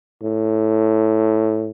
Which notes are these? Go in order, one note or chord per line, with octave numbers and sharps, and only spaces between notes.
A2